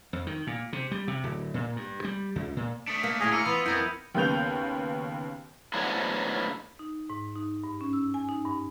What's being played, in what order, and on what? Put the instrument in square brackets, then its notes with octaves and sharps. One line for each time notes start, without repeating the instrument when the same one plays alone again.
[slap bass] F2
D#3
A#2
C3
G3
C3
D1
A#2
G2
G3
C#2
A#2
[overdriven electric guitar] A3 D4 [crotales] D#6 B6 C#7
[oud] A#3
[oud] D2 A2 E4 [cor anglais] G#4 [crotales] F6 A#6 F7
[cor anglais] A#3 [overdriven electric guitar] F4 [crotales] E6 C#7 D#7
[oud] E3 [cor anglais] B3
[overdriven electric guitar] F2 [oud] E4 A#4 [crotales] G6 G#6
[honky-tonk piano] D#2 C#3 B3 G6 F7
[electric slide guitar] A2 D3 F3 F#3 G#3 B3
[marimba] D#4
G#2
D#4
G2
C#4
E6
G#5
D#4
G2